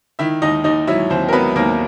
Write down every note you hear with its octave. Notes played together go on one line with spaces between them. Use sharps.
D#3 E4 E5
D#2 D#4 D#5
D#2 D#4 D#5
F#3 E4 E5
D#2 C4 C5
A#4
F#3 B3 B4
D#2 A#3 A#4